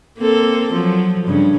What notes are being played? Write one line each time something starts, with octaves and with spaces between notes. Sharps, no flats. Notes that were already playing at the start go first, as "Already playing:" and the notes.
A#3 C4 A4
F3 F#3
G2 C#3 C#4